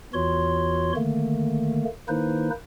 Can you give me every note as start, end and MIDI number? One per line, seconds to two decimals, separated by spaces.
0.14 0.92 40
0.14 0.92 52
0.14 0.92 65
0.14 0.92 66
0.14 0.92 73
0.14 0.92 84
0.96 1.85 50
0.96 1.85 51
0.96 1.85 57
0.96 1.85 58
2.08 2.50 51
2.08 2.50 58
2.08 2.50 63
2.08 2.50 64
2.08 2.50 71
2.08 2.50 72